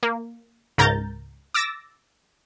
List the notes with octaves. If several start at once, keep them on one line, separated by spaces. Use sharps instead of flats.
A#3
C#2 G#2 A#4 A#5 G6 A6
D6 E6 A6 A#6